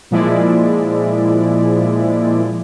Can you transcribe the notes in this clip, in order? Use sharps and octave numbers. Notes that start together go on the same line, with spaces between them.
A#2 F3 G#3 E4 D5